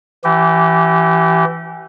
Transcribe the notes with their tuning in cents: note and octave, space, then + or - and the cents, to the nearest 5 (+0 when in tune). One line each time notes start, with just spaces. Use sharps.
E3 +10 G4 -30